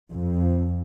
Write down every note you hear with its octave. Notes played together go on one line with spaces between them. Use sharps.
F2